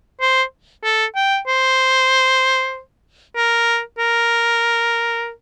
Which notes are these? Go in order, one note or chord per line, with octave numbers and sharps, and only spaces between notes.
C5
A4
G5
C5
A#4
A#4